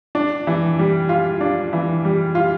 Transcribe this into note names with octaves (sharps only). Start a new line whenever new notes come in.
D4
E3
G3
F4
D4
E3
G3
F4